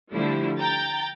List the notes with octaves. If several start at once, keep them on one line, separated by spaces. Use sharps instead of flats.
D3 F3 G3 A3 E4
G5 A#5 G6 A6